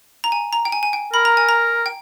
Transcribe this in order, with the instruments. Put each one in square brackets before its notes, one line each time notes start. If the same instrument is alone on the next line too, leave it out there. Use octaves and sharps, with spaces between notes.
[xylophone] A#5
G#5
A#5
G5
G#5
G#5
G5
[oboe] A#4 [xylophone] B5
[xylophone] A#5
G#5
A#5
G5